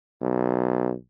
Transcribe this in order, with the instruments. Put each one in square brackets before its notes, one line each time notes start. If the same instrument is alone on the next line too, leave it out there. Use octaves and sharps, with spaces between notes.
[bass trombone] B1